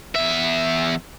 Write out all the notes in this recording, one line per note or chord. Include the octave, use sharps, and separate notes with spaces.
E2 E5